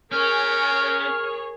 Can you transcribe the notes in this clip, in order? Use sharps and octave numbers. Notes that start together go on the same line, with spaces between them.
B3 C#4 F#4 G#4 A#4 C#5 G5 F6